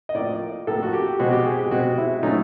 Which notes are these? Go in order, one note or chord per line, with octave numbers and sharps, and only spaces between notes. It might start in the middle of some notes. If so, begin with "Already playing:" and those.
D#5
A2 F3 A#3 D5
A2 F3 A#3 A4
F#4
G4
B2 G#3 C4 F#4
G4
G#4
G4
B2 G#3 C4 F#4
E4
A#2 F#3 A3 C#4 D#4